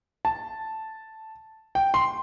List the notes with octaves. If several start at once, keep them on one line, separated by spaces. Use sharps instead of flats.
A5
G5
C6